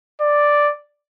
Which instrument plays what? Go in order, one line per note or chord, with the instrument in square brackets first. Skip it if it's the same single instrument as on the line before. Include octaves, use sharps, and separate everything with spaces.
[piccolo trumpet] D5